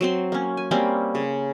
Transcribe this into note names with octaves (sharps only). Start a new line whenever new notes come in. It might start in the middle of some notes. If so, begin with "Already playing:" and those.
F#3 C4 C6
A#3 C#4
G#5
G3 A#3 C4 C#4
C#3